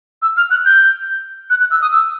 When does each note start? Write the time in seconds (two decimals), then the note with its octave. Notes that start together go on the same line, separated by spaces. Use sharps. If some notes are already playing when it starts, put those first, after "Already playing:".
0.22 E6
0.37 F6
0.51 F#6
0.65 G6
1.50 F#6
1.60 F#6
1.71 E6
1.82 D#6
1.92 E6